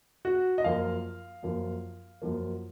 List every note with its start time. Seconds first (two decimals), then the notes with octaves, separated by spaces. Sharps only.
0.25 F#4
0.58 D#5
0.64 F#2 F3 A#3 F5
1.43 F#2 F3 A#3
2.22 F#2 F3 A#3